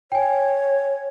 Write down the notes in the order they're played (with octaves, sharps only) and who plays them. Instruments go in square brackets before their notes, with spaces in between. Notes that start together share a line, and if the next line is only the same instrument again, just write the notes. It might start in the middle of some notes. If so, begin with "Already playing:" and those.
[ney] C#5 [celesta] G5 G#5